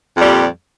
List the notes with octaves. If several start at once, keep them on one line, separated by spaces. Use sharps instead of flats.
F2 A#2 G3